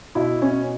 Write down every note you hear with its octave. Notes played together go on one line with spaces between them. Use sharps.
B2 E4
C#4